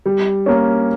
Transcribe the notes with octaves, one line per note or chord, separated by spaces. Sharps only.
G3
A#3 C#4